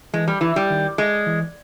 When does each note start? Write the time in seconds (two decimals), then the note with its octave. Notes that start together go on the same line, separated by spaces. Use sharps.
0.13 E3 G#3
0.28 G3
0.41 E3
0.56 G3
0.70 D#3
0.98 G#3
1.26 E3